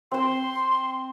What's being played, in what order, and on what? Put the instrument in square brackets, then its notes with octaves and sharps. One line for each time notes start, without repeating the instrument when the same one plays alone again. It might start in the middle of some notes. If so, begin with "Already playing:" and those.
[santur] C4 C5 [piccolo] C6